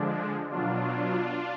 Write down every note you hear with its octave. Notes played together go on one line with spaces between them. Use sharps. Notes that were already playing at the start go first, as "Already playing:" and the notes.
Already playing: D3 F3 G#3 D4
B2 F#3 D4 F4